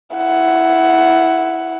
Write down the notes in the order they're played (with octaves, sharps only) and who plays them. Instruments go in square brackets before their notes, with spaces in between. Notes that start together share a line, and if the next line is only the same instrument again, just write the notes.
[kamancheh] E4 F#5